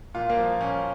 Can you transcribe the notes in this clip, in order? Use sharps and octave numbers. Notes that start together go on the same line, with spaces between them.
A#2 F4
A#3
F3
A#2 C#4